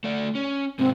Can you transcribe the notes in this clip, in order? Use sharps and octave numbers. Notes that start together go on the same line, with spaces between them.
A3 D5
C#4
G#2 C3 C4